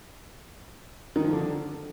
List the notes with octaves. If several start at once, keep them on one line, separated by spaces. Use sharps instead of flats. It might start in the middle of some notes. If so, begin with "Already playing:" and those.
D#3
F3
D3